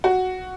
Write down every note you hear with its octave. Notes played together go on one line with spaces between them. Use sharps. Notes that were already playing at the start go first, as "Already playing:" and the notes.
F#4